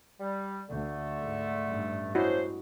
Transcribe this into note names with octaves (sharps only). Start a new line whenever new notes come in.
G3
D2 D3 A3
G#2
A1 G2
C#4 D4 E4 F#4 C5 D#5